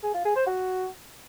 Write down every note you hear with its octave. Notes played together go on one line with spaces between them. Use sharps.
G#4
F4
G#4
C5
F#4